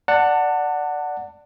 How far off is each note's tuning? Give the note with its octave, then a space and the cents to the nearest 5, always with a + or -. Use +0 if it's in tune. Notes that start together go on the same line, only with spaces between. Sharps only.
D5 +0 F#5 +0 A5 +25